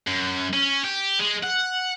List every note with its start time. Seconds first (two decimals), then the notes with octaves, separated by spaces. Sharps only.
0.07 F#2
0.53 C#4
0.84 G4
1.19 G#3
1.43 F#5